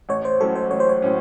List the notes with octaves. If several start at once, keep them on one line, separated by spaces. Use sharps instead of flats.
A1 C#5
C5
A2 F#3 C#4 A4
C5
A1 C#5
C5
C#5
A2 F#3 C#4